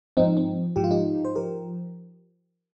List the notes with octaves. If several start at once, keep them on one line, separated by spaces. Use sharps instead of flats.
G#2 F3 C4 D#4
C4
G#2 F3 G4
F4
D#4 G4
C5
F3 G4 A#4